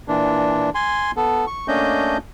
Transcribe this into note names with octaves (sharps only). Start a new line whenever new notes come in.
A#2 E3 D4
G#5 C6
B3 A4
C#6
A3 A#3 C#4 D4 D#5 G6